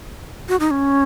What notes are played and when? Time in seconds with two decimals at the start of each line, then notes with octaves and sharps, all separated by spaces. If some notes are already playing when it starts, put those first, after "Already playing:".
0.49 F#4
0.60 D#4
0.71 C#4